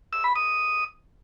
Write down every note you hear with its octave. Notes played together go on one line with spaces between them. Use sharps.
E6
B5
D#6